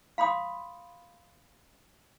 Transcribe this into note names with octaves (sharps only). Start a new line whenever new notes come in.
F5 B5 C6 D#6